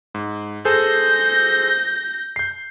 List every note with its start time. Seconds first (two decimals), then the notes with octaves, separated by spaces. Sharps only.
0.15 G#2
0.65 G#4 A4 C5 G6 A#6
2.36 G6 C7